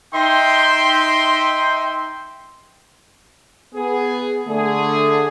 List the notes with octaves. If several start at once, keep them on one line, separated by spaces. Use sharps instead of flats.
D#4 E5 G5 C6
B3 G#4
D3 A3 G#4